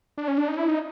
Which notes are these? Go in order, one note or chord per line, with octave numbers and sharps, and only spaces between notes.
D4
C#4
D4
D#4
E4
D#4